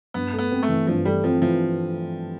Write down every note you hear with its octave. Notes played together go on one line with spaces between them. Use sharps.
G2 B3
A3
B3
C4
A3
E3
G2 F3
G3 A3
F3 C4
E3 F3